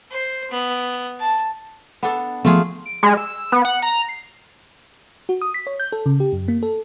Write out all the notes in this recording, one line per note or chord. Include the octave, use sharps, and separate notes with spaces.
C5
B3
A5
B3 D4 A4
F3 A3 B3 F4 G#4
D7
G#3
E6
B3
F#5
A#5
C7
F#4
D#6
B6
C#5
G6
A4
C#3
G4
F#2
A#3
A4